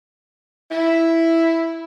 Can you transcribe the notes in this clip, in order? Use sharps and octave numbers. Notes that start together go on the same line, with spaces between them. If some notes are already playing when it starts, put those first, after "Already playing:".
E4